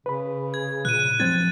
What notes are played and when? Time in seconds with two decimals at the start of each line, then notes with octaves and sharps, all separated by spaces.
0.06 C#3 B4 B5
0.54 G#6
0.85 A#2 F#6 D#7
1.20 F#2 F3 C4 G#6 A6